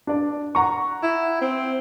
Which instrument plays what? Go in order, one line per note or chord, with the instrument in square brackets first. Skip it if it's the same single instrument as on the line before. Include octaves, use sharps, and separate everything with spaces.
[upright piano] D4 D5
F#5 A#5 C#6
[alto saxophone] E4
C4